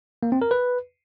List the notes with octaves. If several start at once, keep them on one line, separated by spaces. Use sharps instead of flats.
A#3
C4
A#4
B4